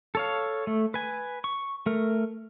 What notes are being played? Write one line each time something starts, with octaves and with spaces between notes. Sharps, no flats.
A4 C#5 F5
A3
B4 G#5
C#6
A3 A#4